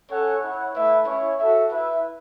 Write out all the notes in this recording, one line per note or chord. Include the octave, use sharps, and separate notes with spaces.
C#4 A4 C#5 F#5
E4 C#5 F#5
A3 E4 B4 E5
C#4 E4 C#5
F#4 A4 E5
E4 B4 E5